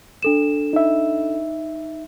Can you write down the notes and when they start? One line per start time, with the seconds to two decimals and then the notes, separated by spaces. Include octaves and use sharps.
0.23 D4 A4 E7
0.73 D#4 E5